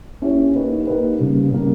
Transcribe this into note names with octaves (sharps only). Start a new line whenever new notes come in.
A#3 C#4 E4 G4 C#5
A#3 D#4 G4 B4
A#3 D#4 G4 B4
C#3 G3 A#3
C#3 G3 A#3